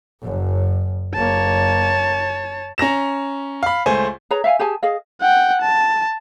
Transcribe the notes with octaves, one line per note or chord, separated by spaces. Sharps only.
F#1 F#2
F#1 A#3 C#5 A5
C#4 A#5 A#6 E7
F5 B5
C#2 A3 C5 G#5
G#4 B4 C#5 A#5
E5 F5 G5 G#5
G4 G#4 G#5 A5
G#4 D#5 F5
F#5 G5
A5